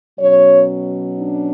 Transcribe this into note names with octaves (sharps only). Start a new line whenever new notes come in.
B2 F#3 C#4 C#5
D4